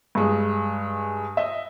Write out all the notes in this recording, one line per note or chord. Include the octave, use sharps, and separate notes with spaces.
G2 G#3
D#5 E5